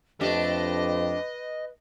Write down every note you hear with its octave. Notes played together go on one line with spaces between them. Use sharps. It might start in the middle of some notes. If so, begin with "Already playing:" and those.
F2 A3 D4 G4 B4 D#5